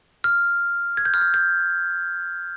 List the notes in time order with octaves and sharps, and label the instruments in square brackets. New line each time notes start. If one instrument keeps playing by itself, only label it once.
[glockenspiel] F6
G#6
G6
F6
G6
G6